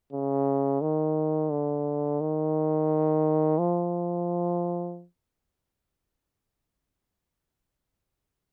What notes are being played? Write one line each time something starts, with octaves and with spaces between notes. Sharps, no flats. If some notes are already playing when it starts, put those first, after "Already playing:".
C#3
D#3
D3
D#3
F3